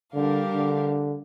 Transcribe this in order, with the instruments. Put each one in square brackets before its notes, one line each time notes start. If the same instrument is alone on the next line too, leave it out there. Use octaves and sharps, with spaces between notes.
[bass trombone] D3 [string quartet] G3 D4 G4 A#4 F5
[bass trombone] D3